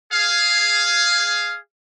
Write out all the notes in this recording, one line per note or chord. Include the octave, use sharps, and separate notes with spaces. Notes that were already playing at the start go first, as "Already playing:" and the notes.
G#4 F5